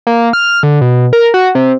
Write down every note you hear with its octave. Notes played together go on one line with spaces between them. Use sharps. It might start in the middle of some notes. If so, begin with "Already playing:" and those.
A#3
F6
D3
B2
A#4
F#4
C3